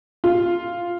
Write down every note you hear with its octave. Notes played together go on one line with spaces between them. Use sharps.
F4